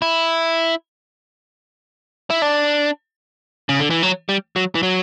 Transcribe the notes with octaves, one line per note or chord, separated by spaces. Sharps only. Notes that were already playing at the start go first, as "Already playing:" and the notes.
E4
E4
D4
C#3
D3
E3
F#3
G3
F#3
E3
F#3